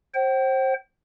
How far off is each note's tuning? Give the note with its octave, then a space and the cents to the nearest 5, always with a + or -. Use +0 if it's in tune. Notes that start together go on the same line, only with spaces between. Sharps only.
C5 +25 G5 -40